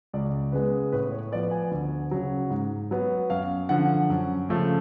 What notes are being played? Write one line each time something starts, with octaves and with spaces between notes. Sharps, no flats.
C#2 D5
C#3 G#3 B3 B4
A2 B4
C#5
F3 B3 D5
G#5
D2
C#3 F#3
G#2
F#3 B3
F#2 F5
D3 F3 F#5
F#2
C#3 F3 A3